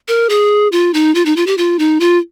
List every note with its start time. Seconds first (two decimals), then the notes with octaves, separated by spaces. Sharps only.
0.08 A#4
0.30 G#4
0.72 F4
0.94 D#4
1.15 F4
1.26 D#4
1.36 F4
1.47 G4
1.58 F4
1.79 D#4
2.00 F4